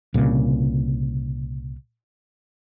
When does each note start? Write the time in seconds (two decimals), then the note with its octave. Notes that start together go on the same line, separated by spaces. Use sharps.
0.14 C2 A#2 C#3